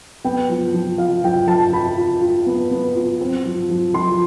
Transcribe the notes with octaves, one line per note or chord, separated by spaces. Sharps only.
B3 G5
F3
F3
F4 F5
F3 G5
F3 A5
F4 B5
F4
F4
B3
B3
F4
C4
F3
F3
F3 C6